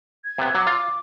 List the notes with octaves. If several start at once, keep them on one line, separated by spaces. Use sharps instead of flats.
G#6
C3 B3
F#3 D6
F4